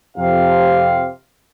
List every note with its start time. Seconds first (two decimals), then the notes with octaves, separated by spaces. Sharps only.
0.17 F2 C3 F5